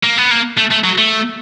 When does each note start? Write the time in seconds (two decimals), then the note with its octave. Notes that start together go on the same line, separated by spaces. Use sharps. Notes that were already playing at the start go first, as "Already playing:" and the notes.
0.03 A#3
0.18 B3
0.31 A#3
0.58 A3
0.71 A3
0.84 F#3
0.98 A3